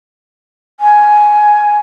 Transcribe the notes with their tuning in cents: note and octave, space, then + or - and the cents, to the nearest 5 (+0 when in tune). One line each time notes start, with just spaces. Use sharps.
G#5 +10